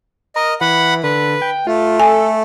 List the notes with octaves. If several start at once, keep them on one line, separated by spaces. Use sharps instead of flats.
A#4 D#5
E3 F#5 B5
D3 B4
G5
A3 F4
A4 G#5